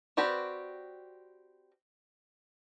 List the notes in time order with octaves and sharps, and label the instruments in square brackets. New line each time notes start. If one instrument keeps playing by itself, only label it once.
[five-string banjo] C4 F#4 G4 B4 D5